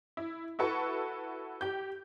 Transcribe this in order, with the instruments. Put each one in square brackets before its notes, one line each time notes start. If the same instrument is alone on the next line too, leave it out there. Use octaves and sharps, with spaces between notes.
[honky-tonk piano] E4
E4 F#4 A4 B4 C#6
G4 G6